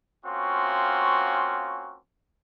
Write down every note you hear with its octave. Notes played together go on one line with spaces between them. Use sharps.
A#3 C4 C#4 F4 F#4